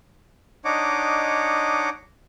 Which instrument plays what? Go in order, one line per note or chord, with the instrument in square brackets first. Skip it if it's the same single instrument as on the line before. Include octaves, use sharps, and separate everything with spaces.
[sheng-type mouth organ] D4 D#4 C#5 D#5 F#5 D6